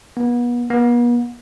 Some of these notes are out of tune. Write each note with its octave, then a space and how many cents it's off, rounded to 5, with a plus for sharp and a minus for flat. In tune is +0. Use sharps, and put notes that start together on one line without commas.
B3 -35
B3 -45